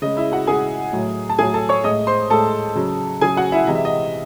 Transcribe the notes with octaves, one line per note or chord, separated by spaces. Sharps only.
C#3 G#3 D#5
E4 E5
F#4 F#5
C#3 G#3 G#4 G#5
A2 F#3
A5
A2 F#3 G#4 G#5
A4 A5
C#5 C#6
A2 G#3 D#5 D#6
C5 C6
A2 G#3 A4 A5
C#3 F#3
C#3 F#3 G#4 G#5
F#4 F#5
E4 E5
C3 E3 G#3 D#5
E5
D#5